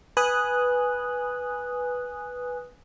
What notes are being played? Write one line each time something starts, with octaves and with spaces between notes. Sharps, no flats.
B4 G#5 D#6 F#6